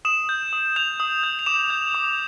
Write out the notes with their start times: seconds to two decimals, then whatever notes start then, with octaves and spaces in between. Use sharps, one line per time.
0.05 D#6 E7
0.29 G6
0.53 D#6
0.76 G6 F7
1.00 D#6
1.23 G6
1.39 F7
1.46 D6 E7
1.70 G6
1.95 D6